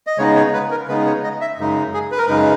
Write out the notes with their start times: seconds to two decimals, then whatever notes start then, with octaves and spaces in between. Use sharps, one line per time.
0.07 D#5
0.18 C#3 G#3 B3 D#4 C#5
0.36 C#5
0.53 B4
0.71 A#4
0.88 C#3 G#3 B3 D#4 B4
1.06 C#5
1.24 D#5
1.41 E5
1.59 F#2 C#3 G#3 D#4
1.94 G#4
2.12 B4
2.18 A#4
2.26 F#2 C#3 G#3 D#4 B4